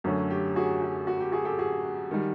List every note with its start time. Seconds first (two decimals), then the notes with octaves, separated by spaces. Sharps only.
0.04 F#2 D3 F#3 A3 C#4 F#4
0.30 G4
0.56 F#4 G#4
0.82 F#4
1.07 F#4
1.20 G4
1.32 F#4 G#4
1.45 G4 A4
1.59 F#4 G#4
2.11 D#3 G3